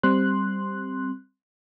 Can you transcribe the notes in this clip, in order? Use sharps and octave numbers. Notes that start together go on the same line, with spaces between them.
G3 C4 C6 F#6